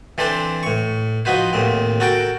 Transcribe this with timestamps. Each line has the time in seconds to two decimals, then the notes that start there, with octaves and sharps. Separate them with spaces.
0.18 E3 C4 D4 A4 C5
0.63 A2 C#6
1.25 F3 D#4 F#4 B4 C5
1.53 D#2 A2 C4
2.00 F#4 A4 A#4 G5